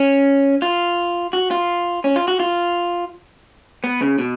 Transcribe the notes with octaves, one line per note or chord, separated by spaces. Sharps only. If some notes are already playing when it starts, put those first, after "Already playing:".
Already playing: C#4
F4
F#4
F4
C#4
F4
F#4
F4
B3
C#3
B2